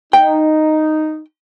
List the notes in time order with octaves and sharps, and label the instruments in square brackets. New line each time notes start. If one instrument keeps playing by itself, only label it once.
[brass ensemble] D#4 [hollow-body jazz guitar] G5